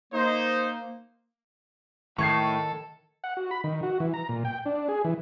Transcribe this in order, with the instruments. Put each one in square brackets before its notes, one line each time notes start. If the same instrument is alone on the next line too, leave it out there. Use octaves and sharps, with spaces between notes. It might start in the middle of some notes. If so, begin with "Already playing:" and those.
[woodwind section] A#3 [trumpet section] D#4 C5
[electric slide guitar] A2 [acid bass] D#3 [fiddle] A4 [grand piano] C#6 G#6 C7
[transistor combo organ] F#5
F#4
B5
D#3
F#4
E3
A#5
A#2
G5
D4
G#4
E3